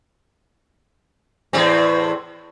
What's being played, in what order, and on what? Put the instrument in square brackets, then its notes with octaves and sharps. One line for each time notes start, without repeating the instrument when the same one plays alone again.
[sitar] E2 A2 C4